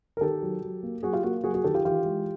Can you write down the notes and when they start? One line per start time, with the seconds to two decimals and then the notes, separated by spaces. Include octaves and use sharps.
0.17 A#4
0.21 D#3 G4 A4
0.43 F#3
0.62 F#3
0.83 A#3
1.03 F#3 F#4 G#4
1.13 F4 G4
1.23 A#3 F#4
1.44 F#3 F#4 G#4
1.54 F#4 G#4
1.64 D#3 G4 A4
1.74 F4 G4
1.85 E3 F4 G4
2.05 G#3